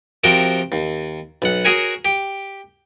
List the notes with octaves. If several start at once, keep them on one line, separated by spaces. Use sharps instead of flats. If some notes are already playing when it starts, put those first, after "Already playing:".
C3 F3 F#4 A#4 G5
D#2
B1 F#5
F#4 G#4 A#4 C#5 G#5
G4